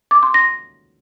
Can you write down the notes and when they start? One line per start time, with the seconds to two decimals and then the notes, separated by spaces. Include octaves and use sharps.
0.11 D6
0.23 C6
0.34 A#6